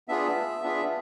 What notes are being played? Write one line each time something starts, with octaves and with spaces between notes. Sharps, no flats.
B3 D4 F4 G#4 E5
B3 D4 F4 G#4